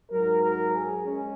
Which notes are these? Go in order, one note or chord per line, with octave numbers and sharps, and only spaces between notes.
G#2 F#3 A#4
A#4
G#4
G#3 C#4